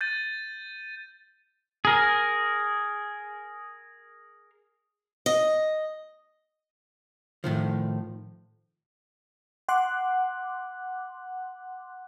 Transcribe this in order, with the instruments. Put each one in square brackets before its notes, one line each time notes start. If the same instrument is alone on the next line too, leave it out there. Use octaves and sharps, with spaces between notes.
[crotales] G6 A6 D#7
[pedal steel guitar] G#4 A#4
[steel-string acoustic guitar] D#5
[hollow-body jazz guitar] A2 D#3 F3
[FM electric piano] F#5 C6 D6 F#6